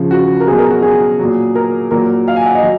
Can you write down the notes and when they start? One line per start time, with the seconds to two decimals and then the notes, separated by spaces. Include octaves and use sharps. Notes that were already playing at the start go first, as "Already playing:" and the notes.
Already playing: C#3 F3
0.11 F#4
0.40 A#4
0.47 B2 F#3 G#4
0.59 A#4
0.70 F#4
0.82 G#4
1.19 A#2 F#3
1.55 A#4
1.91 A#2 F#3 A#4
2.28 F5
2.36 G#5
2.46 F#5
2.55 D#5
2.63 F#3